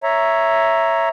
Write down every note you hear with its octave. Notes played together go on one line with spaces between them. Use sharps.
C#5 E5 A#5